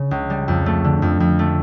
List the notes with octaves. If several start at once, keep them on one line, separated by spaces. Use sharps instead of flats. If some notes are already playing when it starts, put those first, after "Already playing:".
Already playing: C#3
C#2
G3
F2
A3
D3
F2
F2
A3